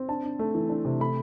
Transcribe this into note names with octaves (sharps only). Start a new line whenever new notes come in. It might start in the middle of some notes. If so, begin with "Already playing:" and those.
Already playing: C4
D4 A5
D4
A3
E3
D4
C3
A3 B5